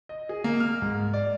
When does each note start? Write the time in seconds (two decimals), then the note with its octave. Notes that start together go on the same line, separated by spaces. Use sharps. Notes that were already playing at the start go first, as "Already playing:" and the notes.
0.09 D#5
0.29 G#4
0.44 A#3
0.60 F6
0.82 G#2
1.13 D5